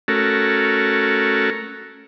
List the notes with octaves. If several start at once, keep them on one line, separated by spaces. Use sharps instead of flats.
A3 C#4 F#4 A4 A#4